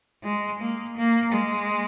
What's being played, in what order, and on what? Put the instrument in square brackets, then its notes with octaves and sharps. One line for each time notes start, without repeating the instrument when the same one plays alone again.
[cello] G#3
A#3
A#3
G#3